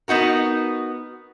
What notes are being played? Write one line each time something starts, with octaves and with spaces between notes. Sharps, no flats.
B3 D#4 F#4 A#4